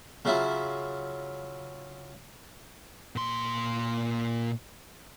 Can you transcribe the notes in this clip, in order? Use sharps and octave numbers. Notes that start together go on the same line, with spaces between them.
C#3 F#3 E4 F4 E5
A#2 C6